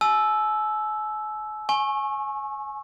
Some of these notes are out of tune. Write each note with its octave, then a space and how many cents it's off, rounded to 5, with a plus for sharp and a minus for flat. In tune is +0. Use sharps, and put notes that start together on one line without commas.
G#5 +45 E6 +0
G#5 +20 C#6 -25